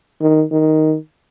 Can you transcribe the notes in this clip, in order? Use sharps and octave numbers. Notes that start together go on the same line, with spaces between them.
D#3
D#3